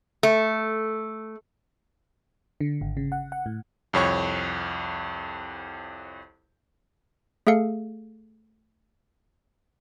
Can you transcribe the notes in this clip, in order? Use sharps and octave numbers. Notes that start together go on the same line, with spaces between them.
A3
D3
G#1
C#3
F#5
F#5
A2
C2 F2 C#5 C#6
A3 G#4 A4 F5 C#7